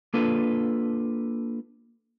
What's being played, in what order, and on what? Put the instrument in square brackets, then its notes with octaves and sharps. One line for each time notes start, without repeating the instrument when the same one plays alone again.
[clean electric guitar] A#3 D4 F4 A4 B4